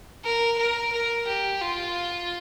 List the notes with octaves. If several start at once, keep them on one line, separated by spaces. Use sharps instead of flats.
A#4
A#4
A#4
G4
F4